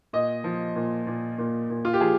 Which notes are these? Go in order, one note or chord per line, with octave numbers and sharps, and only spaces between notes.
A#2 D#5
F3
A#2
A#2
A#2
A#2
F4
G4
F3 G#4